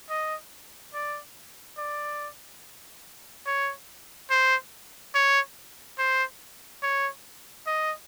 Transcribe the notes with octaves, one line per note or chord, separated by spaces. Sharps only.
D#5
D5
D5
C#5
C5
C#5
C5
C#5
D#5